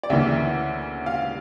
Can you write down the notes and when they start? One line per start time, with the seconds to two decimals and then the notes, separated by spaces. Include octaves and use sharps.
0.03 D5
0.10 D2 C#3 E3 A#3 E5
1.06 F5